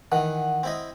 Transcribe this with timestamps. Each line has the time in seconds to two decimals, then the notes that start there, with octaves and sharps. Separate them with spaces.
0.12 D#3 E3 F#5
0.63 C4 E4 D#5